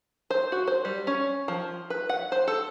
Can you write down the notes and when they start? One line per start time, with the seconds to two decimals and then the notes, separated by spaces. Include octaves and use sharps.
0.30 C5
0.52 F#4
0.67 C5
0.85 G3
1.07 C#4
1.48 F3
1.90 B4
2.09 F#5
2.32 C5
2.48 A4